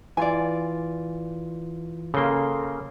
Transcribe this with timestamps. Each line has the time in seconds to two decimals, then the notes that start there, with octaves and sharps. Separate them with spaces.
0.17 E3 F4 D5 G#5
2.14 C#3 A#3 A4 C6